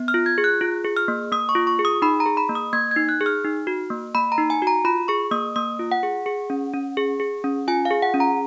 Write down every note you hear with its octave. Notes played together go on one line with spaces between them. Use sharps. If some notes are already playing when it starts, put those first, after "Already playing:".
Already playing: B3
F6
F4
G#6
G#4
F#6
F4
G#4
F6
A#3
A#3 D#6
C#6
F4
C#6
G#4
D#6
D#4 B5
A#5
G#4
B5
A#3
D#6
A#3 G#6
G#6
D#4
F#6
G#4
F6
D#4
F#4
A#3
A#3 B5
A#5
D#4
G#5
F#4
A#5
F4 B5
G#4 C#6
A#3 D#6
A#3 D#6
F4
F#5
G#4
G#4
C#4
C#4
G#4
G#4
C#4
F4 G#5
F5
G#4
F#5
C#4
A#5